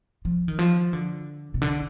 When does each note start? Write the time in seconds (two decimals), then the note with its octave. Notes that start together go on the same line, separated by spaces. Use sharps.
0.25 F3
0.48 D#3
0.59 F3
0.93 D3
1.54 B2
1.62 D3